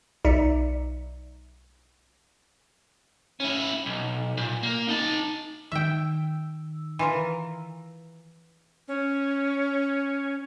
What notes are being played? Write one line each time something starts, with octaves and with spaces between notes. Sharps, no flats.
B1 D#4 D5 E5 C#7
C#4 E4
B1
A#2
A#3
D#4 A5
D#3 E5 G5 E6
E3 F4 A#4
C#4